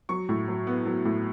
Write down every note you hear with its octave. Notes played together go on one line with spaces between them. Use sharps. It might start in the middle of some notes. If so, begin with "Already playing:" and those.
F#3 C#6
A2
F#3
B3
F#3
A2